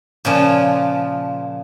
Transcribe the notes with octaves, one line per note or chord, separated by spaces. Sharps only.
A#2 C#3 F3